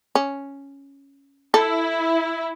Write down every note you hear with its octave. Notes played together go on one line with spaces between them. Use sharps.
C#4
E4 A4